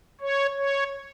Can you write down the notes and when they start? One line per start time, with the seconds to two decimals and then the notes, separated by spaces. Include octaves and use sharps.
0.21 C#5
0.58 C#5